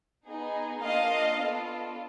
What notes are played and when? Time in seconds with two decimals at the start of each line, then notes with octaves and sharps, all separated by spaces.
0.25 B3 D#4 G#4
0.82 A#3 D4 F4 D#5 F5
1.38 B3 D4 F4 A4